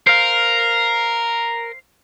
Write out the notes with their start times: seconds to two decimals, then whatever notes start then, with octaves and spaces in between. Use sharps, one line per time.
0.07 A#4 C5 F5